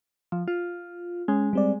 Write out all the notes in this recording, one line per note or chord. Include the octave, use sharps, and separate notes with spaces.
F3
F4
G#3 C#4
G3 C4 D5